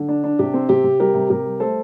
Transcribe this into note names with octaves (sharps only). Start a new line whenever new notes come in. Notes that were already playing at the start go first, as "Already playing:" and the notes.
Already playing: D3
D4
D4
C3 G4
C4
C3 G4
C3
G3 G4 A#4
C3
C3 G4 A#4
G3
A3 A4 C5